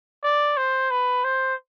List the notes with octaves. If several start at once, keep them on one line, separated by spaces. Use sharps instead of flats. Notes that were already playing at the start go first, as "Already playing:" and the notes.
D5
C5
B4
C5